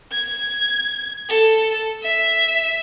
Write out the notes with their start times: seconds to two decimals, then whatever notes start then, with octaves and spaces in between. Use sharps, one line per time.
0.13 G#6
1.29 A4
2.03 E5